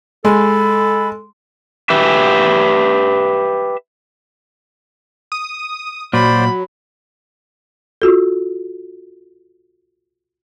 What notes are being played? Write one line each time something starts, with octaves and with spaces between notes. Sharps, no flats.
G#3 A4 B5
G4 B4 E5
D#6
A#2 F#3 C5 D5 B5
F4 F#4 A4